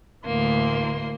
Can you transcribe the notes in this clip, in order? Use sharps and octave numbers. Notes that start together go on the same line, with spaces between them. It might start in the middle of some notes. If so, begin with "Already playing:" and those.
D2 A2 E3 A#3 C6